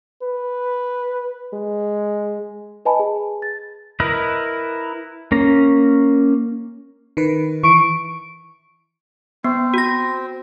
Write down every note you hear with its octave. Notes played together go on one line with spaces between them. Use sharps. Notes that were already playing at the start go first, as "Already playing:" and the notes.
B4
G#3
B4 D#5 G#5 A5 B5
G#4
A6
E4 A#4 B4 D#5
A#3 C#4 A#5
D#3 B4
E3 C#6 D7
B3 C4
F#4 A#6